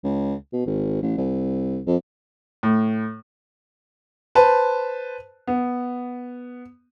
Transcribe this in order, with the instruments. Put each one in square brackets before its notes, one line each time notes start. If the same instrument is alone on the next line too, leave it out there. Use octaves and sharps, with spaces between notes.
[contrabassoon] C#2
B2
G#1
A1
C2
F2
[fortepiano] A2
[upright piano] B4 C5 A5
B3